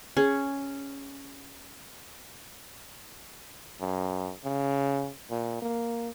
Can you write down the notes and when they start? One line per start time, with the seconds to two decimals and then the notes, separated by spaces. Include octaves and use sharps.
0.17 C#4 G#4
3.80 F#2
4.44 C#3
5.30 A#2
5.62 A#3